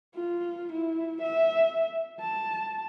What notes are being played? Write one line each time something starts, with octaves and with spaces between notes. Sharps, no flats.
F4
E4
E5
A5